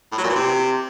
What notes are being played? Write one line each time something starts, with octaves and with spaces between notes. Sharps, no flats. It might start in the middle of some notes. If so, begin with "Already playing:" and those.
A2
F#3
A#2
E3
C3